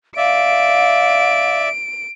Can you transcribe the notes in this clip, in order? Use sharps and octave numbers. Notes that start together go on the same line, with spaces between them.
D5 E5 F5 D7